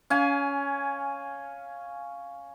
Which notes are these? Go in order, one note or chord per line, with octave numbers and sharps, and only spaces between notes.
C#4 F5 G#5